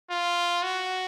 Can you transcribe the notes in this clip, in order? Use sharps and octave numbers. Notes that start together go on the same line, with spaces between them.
F4
F#4